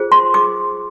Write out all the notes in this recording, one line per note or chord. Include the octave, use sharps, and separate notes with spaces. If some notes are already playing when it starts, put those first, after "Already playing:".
Already playing: F4 G#4 C5
C6
D6